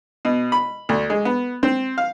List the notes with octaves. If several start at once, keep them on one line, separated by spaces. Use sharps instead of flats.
B2
B5
D2
G#3
B3
C4
F5